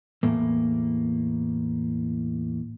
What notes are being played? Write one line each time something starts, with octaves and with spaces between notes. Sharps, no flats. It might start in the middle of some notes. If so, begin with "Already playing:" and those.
E2 A2 A#3